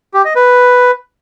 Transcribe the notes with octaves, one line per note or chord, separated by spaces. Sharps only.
G4
D#5
B4